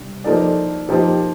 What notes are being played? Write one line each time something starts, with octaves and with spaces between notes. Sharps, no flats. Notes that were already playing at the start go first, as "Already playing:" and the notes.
Already playing: C3 G3 D4
F3 A#3 D#4 A4 D5
F3 A#3 D#4 G4